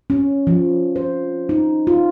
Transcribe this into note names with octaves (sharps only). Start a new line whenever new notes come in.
C#4
F3
C5
D#4
F4